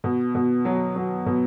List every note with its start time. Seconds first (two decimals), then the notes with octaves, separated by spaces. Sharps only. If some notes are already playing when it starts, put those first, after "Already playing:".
0.04 B2
0.35 B2
0.65 F#3
0.96 F#3
1.26 B2